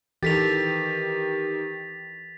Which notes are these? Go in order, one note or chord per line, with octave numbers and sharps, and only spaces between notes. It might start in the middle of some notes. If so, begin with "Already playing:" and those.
D#3 E3 G4 A4 A6 B6 F7